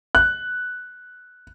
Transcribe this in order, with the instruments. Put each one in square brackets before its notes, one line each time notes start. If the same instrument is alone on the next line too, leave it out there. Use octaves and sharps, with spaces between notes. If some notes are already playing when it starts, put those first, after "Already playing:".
[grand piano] F#6